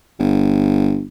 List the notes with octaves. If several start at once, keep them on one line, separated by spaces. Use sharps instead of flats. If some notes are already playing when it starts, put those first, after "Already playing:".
G1